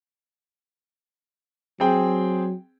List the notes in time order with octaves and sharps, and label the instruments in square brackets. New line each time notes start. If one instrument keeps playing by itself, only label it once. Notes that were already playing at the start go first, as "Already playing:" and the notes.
[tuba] F#3 [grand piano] C4 G#4 G5